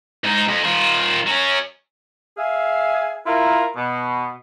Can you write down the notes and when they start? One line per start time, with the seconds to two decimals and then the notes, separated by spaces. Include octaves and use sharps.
0.24 G#2 D#4
0.48 F2
0.64 D#3 F4
1.26 F#3 C#4
2.38 G#4 E5 F5 G#5
3.27 E4 F4 A#4
3.76 B2